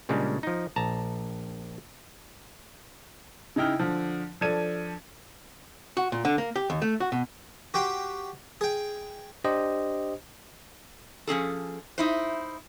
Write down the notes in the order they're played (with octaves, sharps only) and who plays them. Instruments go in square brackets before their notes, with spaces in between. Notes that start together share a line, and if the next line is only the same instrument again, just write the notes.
[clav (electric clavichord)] A#2 C#3 G3 G#3 C#4 D4
F3 D#4
A#1 A5 A#5
[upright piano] C#3 D#4 E4 G5 F6
D3 F3
F3 D4 A4 D5 G#6 D#7
[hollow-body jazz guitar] F#4
A#2
D3
A#3
G4
D#2
A3
F#4
B2
[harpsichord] F#4 G4 G5 C6
G#4 G5
[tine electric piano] D4 G4 C5 D#5
[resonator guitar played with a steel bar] F3 C#4 G#4 A4
D#4 E4 C5